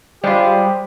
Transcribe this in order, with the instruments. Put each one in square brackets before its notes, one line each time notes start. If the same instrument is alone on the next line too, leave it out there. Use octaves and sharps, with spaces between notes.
[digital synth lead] G3 [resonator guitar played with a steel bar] G#3 F4 [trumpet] G4 [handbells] C5 B5